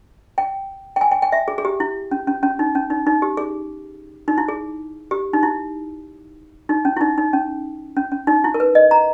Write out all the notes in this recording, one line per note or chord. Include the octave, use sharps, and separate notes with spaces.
G5
G5
G#5
G5
G5
E5
G#4
G#4
G4
E4
C#4
C#4
C#4
D#4
C#4
D#4
D#4
G4
G#4
D#4
E4
G#4
G4
D#4
E4
D#4
C#4
E4
D#4
D#4
C#4
C#4
C#4
D#4
E4
A#4
B4
D#5
A#5